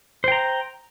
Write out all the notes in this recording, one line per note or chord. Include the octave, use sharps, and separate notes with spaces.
C5 G5 A#5